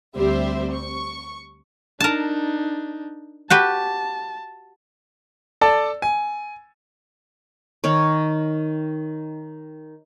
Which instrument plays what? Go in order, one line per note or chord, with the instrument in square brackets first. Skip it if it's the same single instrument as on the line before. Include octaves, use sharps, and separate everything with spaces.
[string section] D2 G3 C4 G4 C5 E5
C#6
[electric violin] D4 D#4 [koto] A#4 A5
[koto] F#4 G4 B4 [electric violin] A5
[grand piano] A4 D5 A5
G#5
[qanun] D#3 D#4 C#5